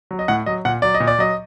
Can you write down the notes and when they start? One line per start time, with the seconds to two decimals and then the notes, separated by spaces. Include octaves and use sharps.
0.11 F#3
0.19 D#5
0.28 A2 F#5
0.46 F#3 D#5
0.65 A#2 F#5
0.82 F#3 D5
0.94 D#5
1.00 A#2
1.07 D5
1.19 F#3 D#5